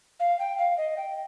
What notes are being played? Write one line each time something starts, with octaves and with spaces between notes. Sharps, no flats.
F5
G5
F5
D#5
G5